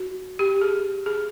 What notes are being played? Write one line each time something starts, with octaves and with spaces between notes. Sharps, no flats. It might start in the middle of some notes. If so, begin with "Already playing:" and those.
Already playing: F#4
G4
G#4
G#4